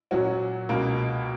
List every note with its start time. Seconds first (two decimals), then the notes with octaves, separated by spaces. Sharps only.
0.11 A#2 F#3 C#4 F#4
0.69 C#2 B2 A#3